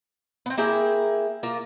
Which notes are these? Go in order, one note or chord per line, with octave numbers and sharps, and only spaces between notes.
B3 C4
A#3 E4 G#4 G5
A#3 F4 A#4